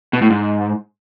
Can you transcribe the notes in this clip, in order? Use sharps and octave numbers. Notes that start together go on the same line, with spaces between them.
B2
A2
G#2